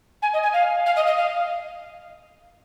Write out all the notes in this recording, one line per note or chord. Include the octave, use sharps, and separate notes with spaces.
G#5
D#5
G#5
F5
F5
D#5
D#5
F5